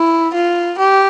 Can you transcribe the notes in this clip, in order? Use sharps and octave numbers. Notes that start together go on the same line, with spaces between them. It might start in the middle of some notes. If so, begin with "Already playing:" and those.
Already playing: E4
F4
G4